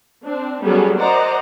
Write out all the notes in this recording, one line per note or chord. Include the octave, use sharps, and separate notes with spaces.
C4 D4
F#3 G3 B3 C#4 G#4 A4
A#4 C5 D5 D#5 F#5 A#5